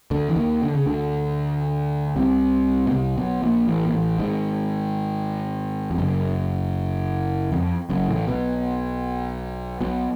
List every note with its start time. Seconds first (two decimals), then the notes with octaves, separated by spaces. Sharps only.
0.11 D2 D3
0.29 E3
0.36 D#2 D#3
0.63 D3
0.75 C#3
0.86 D2 D3
2.16 C2 C3
2.87 B2
2.91 C2 C3
3.17 B1 B2
3.42 A#1 A#2
3.68 A1 A2
3.86 A#2
3.93 A1 A2
4.19 G#1 G#2
5.91 F2
5.98 F#1 F#2
7.52 F2
7.90 F#1 F#2
8.08 A1 A2
8.28 B1 B2
9.81 B1 B2